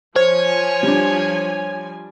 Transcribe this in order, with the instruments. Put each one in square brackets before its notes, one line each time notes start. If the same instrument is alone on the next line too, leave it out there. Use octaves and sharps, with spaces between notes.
[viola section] F3 G#5 [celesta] C5 [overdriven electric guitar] C#5
[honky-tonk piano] G3 D4